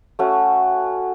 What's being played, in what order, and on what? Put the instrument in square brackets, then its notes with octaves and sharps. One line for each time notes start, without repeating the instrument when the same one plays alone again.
[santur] A3 C#4 F#4